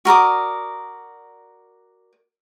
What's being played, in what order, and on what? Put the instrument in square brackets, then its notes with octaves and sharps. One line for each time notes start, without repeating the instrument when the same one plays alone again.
[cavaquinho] F#4 A#4 D5 D#6